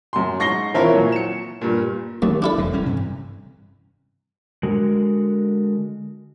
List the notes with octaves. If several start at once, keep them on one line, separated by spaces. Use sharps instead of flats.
F#2 C6
G#2 C#6 A#6 C7 G7
E3 C4 E4 F4 A#4 C#5
A#2 F#3
C#7 E7
G2 A#2
D#2 F#3 A3
D4 E4 A4
F1 E2 D3
E1 G3 C#4
G2 C3 E3
D3 G#3 F#4 A#4